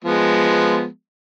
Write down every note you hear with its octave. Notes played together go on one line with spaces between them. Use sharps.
F3 G#3 B3